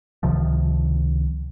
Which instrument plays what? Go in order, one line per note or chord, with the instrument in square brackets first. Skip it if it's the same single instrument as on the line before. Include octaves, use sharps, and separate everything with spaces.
[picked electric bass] C#2 C3 D#3 F3